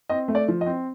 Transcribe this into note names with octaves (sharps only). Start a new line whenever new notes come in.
C4 D#5
A3
D5
F3
D#5
C4